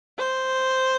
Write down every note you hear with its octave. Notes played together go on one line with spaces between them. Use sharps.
C5